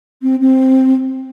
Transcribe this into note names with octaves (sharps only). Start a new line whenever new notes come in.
C4
C4